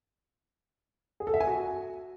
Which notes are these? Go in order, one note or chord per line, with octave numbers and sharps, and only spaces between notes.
G#4
A4
E5
G#5
F#4